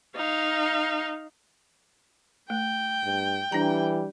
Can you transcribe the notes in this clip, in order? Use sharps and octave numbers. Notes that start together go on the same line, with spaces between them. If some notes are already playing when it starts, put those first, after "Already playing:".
D#4 F5
A3 G5
G2
E3 G3 D4 A#5